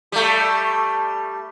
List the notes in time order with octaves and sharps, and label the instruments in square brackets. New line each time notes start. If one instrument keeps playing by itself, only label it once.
[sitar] G3 A3